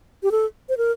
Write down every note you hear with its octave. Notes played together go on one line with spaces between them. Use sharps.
G4
A4
C5
A#4